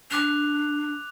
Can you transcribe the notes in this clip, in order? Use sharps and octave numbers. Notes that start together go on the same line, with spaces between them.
D4 D6 F#6 F7